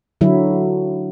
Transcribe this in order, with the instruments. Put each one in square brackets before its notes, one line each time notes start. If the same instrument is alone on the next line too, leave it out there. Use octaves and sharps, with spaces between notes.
[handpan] D3 F#3 E4